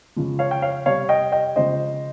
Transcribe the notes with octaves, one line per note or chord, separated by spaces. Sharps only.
C#3 F3 G#3
C#5 F5
G5
C#5 F5
C3 G3 C#5 F5
D#5 G5
D#5 G5
C#3 F3 G#3 C5 D#5